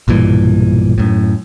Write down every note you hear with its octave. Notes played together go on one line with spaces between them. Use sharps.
B1 G2 A#2 E3
F#2 A2